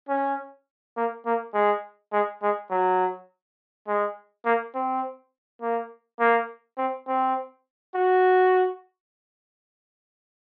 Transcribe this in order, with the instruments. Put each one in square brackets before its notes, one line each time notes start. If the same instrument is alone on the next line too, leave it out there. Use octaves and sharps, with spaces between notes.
[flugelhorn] C#4
A#3
A#3
G#3
G#3
G#3
F#3
G#3
A#3
C4
A#3
A#3
C4
C4
F#4